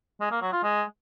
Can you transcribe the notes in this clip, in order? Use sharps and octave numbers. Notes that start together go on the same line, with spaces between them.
G#3
A#3
F#3
F4
G#3